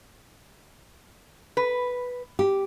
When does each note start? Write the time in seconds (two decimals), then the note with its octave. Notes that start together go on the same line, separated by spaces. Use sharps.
1.57 B4
2.39 G4